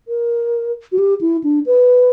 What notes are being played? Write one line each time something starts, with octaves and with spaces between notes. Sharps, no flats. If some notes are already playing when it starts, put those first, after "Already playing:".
A#4
F#4
G4
E4
D4
B4